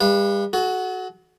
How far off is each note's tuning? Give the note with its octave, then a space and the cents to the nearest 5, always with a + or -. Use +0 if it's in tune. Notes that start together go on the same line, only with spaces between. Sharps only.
G3 +40 B4 -20 F5 -25
F#4 +0 A4 -45